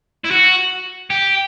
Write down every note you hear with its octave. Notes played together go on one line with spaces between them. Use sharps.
E4
F#4
G4